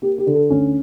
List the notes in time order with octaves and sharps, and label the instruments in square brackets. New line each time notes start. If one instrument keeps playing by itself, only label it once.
[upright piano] A#3 G4
G4
D3
A4
D2 C#4